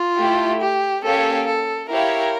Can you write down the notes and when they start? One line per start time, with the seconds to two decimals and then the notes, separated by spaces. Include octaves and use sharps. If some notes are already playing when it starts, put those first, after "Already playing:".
Already playing: F4
0.18 A3 E4 G4
0.61 G4
1.04 A#3 C#4 G4 A4 C#5 F5
1.47 A4
1.90 E4 G4 A#4 C#5 F5